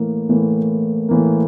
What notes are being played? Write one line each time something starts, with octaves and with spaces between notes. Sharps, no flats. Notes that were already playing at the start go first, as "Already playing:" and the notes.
Already playing: A2 E3 A#3
A2 E3 A#3
A2 E3 A#3